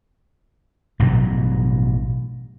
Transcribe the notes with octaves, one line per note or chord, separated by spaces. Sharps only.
A1 G2 B2 F#3